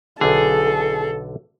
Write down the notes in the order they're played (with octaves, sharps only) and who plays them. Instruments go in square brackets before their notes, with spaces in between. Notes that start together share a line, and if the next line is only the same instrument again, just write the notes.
[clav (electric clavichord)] B1 D3 [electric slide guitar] G#4 [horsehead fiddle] A4